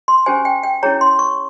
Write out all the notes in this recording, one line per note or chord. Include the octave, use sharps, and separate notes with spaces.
C6
C#4 G4 C5 G#5
G5
G5
C#4 E4 G#4 C#5 A#5
C6
C#6